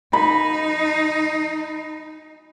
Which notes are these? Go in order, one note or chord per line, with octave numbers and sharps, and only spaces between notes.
D#4 B5